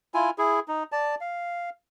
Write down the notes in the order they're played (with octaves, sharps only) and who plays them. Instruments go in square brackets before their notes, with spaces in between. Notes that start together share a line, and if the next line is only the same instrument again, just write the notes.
[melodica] E4 F4 G#5
E4 G#4
D#4
D5 A5
F5